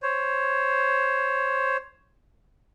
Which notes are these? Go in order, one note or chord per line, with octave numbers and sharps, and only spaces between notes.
C5 C#5